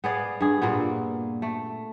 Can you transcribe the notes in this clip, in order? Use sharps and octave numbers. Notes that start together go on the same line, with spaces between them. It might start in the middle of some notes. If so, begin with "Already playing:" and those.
B3 G#4 D5 F5
G2 G#4
A#2 A#3 B3
A3